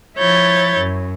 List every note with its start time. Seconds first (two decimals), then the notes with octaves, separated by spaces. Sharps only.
0.18 F3 E4 C#5 G6 A6
0.78 F#2